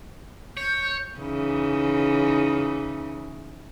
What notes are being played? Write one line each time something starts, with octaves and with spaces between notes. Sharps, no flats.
C#5 G6
C#3 E3 D#4